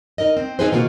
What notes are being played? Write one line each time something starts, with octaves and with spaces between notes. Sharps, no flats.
D#4 A#4 D#5
C4
C4 D#4 F4 G#4 B4 C5
B2 D#3 A#3 F4 F#4